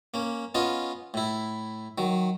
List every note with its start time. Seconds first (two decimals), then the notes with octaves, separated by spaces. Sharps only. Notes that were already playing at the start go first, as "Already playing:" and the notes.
0.14 A#3 C#4
0.55 B3 C#4 F4 D#5
1.14 A2 E4
1.98 D#3 F#3